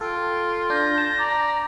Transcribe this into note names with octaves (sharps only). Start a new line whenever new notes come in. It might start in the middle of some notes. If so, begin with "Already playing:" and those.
F4 A4 G5
D4 G6 A#6
A5
D5 A#5